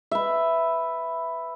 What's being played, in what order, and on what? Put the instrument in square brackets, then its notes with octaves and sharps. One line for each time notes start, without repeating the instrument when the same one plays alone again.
[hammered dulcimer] B4 E5